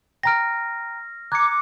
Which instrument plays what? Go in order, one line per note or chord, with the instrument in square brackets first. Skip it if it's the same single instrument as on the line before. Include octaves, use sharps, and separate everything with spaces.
[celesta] G5 A#5 D7 [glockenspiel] F6 A#6
[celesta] A#5 G#6 [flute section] D6 [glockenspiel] F#6 C#7